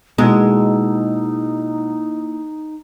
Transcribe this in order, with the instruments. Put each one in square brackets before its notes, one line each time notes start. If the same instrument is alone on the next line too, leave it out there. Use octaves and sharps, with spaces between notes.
[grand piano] B2 [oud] G#3 [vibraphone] A#3 E4 [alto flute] D#4